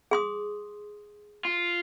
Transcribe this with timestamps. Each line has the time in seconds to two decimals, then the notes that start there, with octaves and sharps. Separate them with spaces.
0.11 G#4 C6 D#6
1.45 F4